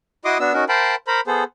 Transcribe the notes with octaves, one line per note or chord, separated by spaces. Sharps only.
E4 F#4 D#5 C6 D6 D#6
B3 D4 F#4 E6
C#4 D#4 F#4 A#4
A#4 C5 F5 G5 A5 B5
A#4 C5 A#5 B5
B3 G#4 A4 C5